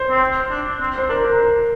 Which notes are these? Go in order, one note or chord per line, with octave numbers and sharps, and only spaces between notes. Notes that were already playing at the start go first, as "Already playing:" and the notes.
Already playing: C5
C4
D4
C4
C5
D4 A#4
A#4